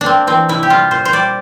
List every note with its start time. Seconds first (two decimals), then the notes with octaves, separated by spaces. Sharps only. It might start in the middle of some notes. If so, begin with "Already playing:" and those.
0.01 D4
0.06 A#3 C4
0.27 E3 C4
0.49 C3 E4
0.63 G4
0.70 G3 F4
0.91 A#2 C5
1.05 C5
1.13 G3 D5